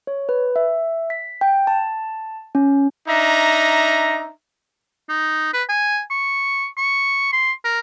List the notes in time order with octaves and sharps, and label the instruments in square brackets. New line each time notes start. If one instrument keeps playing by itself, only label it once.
[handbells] C#5
B4
E5
B6
G5
A5
C#4
[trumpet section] D4 D#4 E5 A#5
[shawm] D#4
B4
G#5
C#6
C#6
C6
A#4